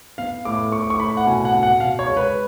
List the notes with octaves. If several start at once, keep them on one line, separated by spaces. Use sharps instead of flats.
B3 F5
A2 D6
A2 C#6
D6
C#6
A2 B5
F#5
B2 G#5
F#5
B2
F#5
B2 F5
C#5
G#3
B4